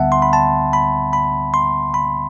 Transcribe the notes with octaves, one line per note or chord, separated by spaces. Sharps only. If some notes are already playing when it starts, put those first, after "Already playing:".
Already playing: D2 D3 G3 B3 E5 F#5 A5
C6
B5
A5
B5
B5
C6
B5